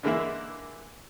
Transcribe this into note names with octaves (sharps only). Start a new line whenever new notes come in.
D3 E3 G#3 A#3 E4